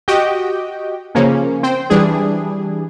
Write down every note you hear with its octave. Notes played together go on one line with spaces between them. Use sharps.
F#4 G4 D#5 G5
C#3 F3 A#3 C#4
C4 C5 G5
E3 G3 D4 G#4